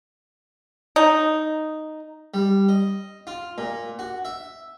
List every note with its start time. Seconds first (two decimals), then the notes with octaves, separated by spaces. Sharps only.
0.96 D#4
2.34 G3
2.69 D#5
3.27 F4
3.58 A#2
3.99 F#4
4.25 E5